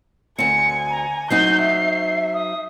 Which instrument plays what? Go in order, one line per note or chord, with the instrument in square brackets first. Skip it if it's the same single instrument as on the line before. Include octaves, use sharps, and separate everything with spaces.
[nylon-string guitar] D2 C4 [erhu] G#5 [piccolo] C#7
[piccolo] A#5
[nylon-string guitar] F#3 C4 D#4 [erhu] G6 [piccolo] C7
[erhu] E5
[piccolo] D#6